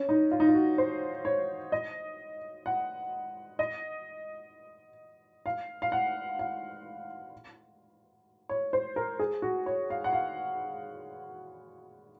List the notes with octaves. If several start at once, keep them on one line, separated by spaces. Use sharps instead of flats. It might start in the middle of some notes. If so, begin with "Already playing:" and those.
Already playing: C#4
D#4
F4
D#4
F4
F#4
C5
C#5
D#5
F#5
D#5
F5
F5
F#5
F5
C#5
C5
A#4
G#4
F#4
C#5
F5
F#5
F5